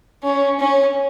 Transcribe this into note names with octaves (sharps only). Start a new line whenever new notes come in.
C#4
C#4